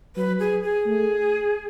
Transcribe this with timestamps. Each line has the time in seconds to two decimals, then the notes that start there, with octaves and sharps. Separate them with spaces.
0.16 F#3 B4
0.40 G#4
0.62 G#4
0.86 A3